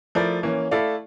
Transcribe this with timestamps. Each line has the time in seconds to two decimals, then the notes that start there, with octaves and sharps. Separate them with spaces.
0.15 F3 A3 E4 A#4 D5
0.43 E3 A#3 C#4
0.71 A3 E4 A4 D5 F5